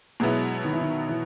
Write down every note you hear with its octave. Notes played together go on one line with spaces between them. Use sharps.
B2 F#3 G#3 B3 E4
D#3
E3
D#3
E3